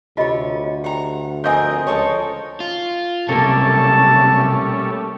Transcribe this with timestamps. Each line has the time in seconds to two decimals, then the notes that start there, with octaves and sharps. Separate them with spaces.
0.17 D2 C3 C#4 F4 D#5 B5
0.84 G4 F#5 G5 A#5
1.44 F3 C4 A#4 D5 D#5 G#5 G6
1.87 C#2 F3 A4 C#5
2.60 F4
3.29 B1 C3 G3 A3 A#3 C#4 A4 A5